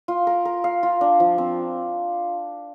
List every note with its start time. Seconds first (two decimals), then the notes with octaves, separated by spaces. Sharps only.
0.08 F4
0.27 A#4
0.45 A#4
0.64 F5
0.83 F4
1.01 D4
1.20 F3
1.38 C4